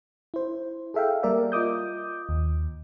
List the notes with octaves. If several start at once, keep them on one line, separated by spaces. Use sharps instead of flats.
E4 C5
G#4 A4 E5 F5 G5
G3 A#3 A#4 D5 E5
F4 D#5 D6 D#6 G6
D#2